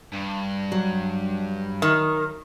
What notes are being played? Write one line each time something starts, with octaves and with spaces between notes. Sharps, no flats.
G2
F#3
D#3